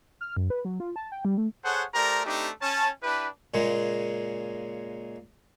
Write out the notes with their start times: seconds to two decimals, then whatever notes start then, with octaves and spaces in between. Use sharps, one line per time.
0.21 F6
0.37 F#2
0.50 B4
0.65 F#3
0.80 F4
0.96 A5
1.12 G5
1.25 G3
1.37 A3
1.65 G#4 A4 C5 C#5 F#5
1.95 A3 G4 A#4 C5 D5 A#5
2.26 A3 C4 D4 D#4 G4
2.62 C#4 A5
3.03 D4 E4 G4 B4
3.54 A#2 C#3 G#3 A#3